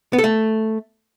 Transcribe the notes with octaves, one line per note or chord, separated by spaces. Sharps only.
B3
A4
A3